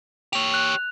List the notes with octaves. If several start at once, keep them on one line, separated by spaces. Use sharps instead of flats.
G4 C#5 F7
F#6